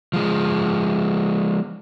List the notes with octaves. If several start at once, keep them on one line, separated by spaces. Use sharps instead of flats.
F3 G#3